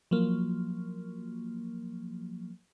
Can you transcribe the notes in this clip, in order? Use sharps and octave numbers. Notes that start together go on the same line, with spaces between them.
F3 F#3 A#3